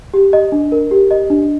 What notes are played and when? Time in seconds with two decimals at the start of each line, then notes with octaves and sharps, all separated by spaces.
0.14 G4
0.33 D#5
0.52 D4
0.72 A#4
0.91 G4
1.11 D#5
1.30 D4